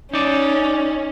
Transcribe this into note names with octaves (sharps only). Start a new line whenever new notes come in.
C#4 D#4 D5